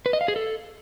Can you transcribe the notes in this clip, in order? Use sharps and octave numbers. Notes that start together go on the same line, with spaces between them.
B4
D#5
F5
G#4
A4